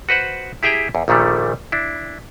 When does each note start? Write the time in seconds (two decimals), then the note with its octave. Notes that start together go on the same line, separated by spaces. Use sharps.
0.09 F#4 B4 C5 F#5
0.63 E4 G4 G#4 E5 G5 A#5
0.95 E2
1.08 A#1 A#2 D#3 G3 A3
1.72 D4 E4